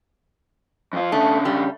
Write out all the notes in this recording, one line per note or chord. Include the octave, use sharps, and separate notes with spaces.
F2 F4
C#3 A3 D4
G3